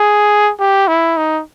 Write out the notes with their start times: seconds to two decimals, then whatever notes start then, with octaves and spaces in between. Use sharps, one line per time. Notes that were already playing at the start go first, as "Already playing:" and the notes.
Already playing: G#4
0.59 G4
0.88 E4
1.17 D#4